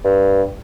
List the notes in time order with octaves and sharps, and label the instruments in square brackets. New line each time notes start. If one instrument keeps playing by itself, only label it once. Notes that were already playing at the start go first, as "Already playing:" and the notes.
[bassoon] G2